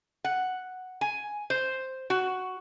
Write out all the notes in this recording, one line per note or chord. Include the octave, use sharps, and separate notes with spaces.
F#5
G#5
C5
F#4